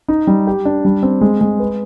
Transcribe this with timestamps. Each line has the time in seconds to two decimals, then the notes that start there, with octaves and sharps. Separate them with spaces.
0.08 D#4
0.27 G3
0.47 G4
0.65 D4
0.85 G3
1.03 C4
1.21 G#3
1.41 G#3
1.60 B4